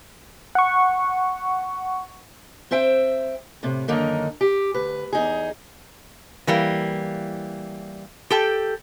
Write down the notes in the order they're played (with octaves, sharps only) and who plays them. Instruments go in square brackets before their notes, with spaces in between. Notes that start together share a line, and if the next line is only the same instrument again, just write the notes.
[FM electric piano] F#5 C#6
[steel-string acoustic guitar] C4 C5 E5 G5
A2 C3
F#2 D3 D#3 A#3 D#4
G4
D2 B4
E2 D#4 G#4
[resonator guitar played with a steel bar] E3 G3 A#3
G4 A4 G5